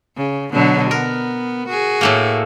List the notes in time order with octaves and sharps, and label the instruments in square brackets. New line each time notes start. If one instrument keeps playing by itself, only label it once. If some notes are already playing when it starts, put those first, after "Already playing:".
[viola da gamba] C#3
B2 D3 F#3
[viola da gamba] B3 [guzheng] A#4
[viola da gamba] F#4 G#4
[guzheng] A2 A3 A#3